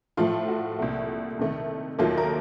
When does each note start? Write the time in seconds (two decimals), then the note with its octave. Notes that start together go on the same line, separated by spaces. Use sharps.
0.17 A2 F3 A3 F4
0.48 F#4
0.79 C2 A#2 A3
1.39 C2 C3 D#3 A3
1.99 D#2 D#3 F#3 A3 F4
2.18 A#4